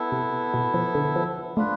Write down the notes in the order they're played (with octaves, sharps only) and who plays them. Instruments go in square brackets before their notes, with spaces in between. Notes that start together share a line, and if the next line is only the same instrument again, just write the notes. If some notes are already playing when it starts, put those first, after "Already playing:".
Already playing: [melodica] B3 E4 A4
[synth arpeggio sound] C3
B2
F3
D3
F3
[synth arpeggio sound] A3 [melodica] D4 F4 B4